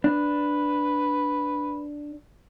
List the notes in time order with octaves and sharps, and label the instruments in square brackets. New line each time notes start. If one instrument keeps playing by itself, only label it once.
[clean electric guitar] D4 [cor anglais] B4